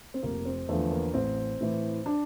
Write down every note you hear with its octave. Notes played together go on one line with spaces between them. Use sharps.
C4
F1 A#3
C4
E2 D3 F3 A3
A#3
A1 C4
A2 E3
D4